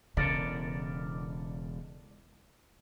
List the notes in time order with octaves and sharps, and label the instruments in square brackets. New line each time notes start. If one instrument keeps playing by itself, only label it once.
[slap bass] E1 E2 [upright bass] C#3 [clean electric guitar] A4 A#4 D5